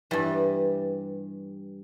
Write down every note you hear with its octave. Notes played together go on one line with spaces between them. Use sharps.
G2 E3 G3